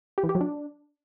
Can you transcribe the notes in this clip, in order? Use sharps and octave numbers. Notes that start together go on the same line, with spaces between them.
G4
E3
G4
F#3
D4